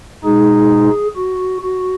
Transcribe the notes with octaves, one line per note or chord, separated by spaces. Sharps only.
B2 G#3 D#4 G#4
F#4
F#4